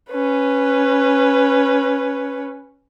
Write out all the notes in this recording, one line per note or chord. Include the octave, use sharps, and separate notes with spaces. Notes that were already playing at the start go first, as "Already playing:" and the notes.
C#4 B4